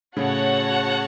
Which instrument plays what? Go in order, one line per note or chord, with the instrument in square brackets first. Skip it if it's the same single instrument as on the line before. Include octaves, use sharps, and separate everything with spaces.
[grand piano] A2 C#3 [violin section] F#4 C#5 F#5 A5